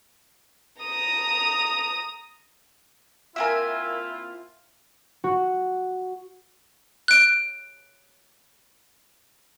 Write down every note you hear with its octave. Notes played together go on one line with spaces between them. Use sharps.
A#5 D#6
A#3 C4 E4 F4 A#4 E5 G#5
F#4
F#6 D7